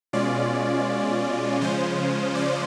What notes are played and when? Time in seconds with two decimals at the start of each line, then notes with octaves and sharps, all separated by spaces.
0.13 B2 G#3 C#4 F4 D5
1.61 C#3 F3 G#3 C#4 F4 C5
2.35 D5